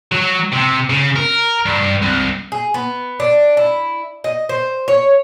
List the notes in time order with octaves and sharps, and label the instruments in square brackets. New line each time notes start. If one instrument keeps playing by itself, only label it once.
[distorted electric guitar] F#3
C3
C#3
A#4
G2
C2
[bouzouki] G#4
B3
D4
E4
D#5
C5
C#5